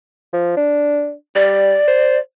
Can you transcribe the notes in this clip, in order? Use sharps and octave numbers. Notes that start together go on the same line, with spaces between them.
F3
D4
G3 D5
C5